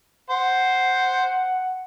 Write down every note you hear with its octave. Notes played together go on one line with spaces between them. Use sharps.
C5 F#5